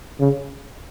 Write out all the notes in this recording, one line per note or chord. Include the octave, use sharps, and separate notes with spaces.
C#3